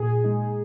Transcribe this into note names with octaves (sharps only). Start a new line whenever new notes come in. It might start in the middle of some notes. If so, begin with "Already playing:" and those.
Already playing: A#2 G#4
G#3 D#4